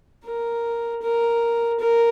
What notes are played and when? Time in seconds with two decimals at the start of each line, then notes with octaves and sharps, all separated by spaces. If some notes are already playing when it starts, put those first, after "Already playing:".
0.24 A#4
1.02 A#4
1.80 A#4